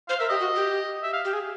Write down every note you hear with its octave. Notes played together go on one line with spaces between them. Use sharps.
C5 F5
A#4 E5
G4 D#5
F#4
G4
E5
F5
G4
G#4